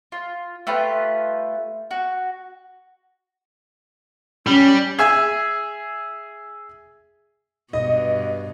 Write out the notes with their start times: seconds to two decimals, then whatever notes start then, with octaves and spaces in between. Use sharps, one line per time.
0.12 F4
0.67 A3 F4 G4 B4
1.91 F#4
4.47 G3 C#4
4.99 G#4 E5 G#5
7.73 G2 B2 D#5